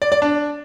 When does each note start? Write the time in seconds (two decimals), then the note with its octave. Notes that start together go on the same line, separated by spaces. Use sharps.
0.02 D5
0.12 D5
0.22 D4